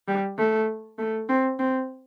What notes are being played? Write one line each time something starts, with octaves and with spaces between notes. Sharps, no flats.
G3
A3
A3
C4
C4